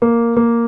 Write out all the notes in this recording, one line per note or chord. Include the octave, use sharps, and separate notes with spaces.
A#3
A#3